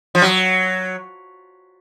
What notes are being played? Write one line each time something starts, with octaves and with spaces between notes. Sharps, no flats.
F3
F#3